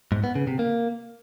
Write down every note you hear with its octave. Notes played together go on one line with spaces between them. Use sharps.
G#2
B3
C#3
C3
A#3